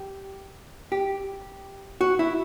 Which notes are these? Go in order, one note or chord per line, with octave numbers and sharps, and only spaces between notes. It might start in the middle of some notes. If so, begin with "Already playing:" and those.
Already playing: G4
G4
F#4
E4